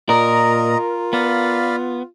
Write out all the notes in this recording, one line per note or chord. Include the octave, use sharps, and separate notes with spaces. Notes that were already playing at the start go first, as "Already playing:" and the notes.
A#2 F4 A#4 D5 D#5 A#5
B3 D5 F5 B5